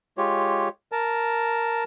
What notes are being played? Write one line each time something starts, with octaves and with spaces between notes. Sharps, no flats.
G#3 F4 G4 C#5
A#4 A5